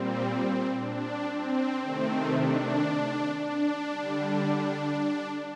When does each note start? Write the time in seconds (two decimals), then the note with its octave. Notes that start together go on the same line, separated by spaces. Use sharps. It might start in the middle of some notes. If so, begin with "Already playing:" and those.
Already playing: A#2 G3 C4
0.78 D4
1.29 C4
1.82 C3 D#3 A3 C4
2.35 D4
3.38 D4
3.90 D3 G3